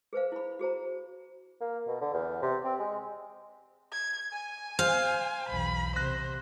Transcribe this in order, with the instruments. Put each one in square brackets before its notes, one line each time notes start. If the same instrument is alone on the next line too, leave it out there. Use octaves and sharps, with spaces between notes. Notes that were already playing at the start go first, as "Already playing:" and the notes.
[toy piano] G#4 B4 C5 F5
E4 B5
F#4 G#4 C5 A#5
[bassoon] A#3
B2
D3
E2
C3
C4
G#3
[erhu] G#6
G#5
[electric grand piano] C5 [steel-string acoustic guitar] F5
[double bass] B1 E2 [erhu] B5
[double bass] C3 [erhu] C5 [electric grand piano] F#6 A#6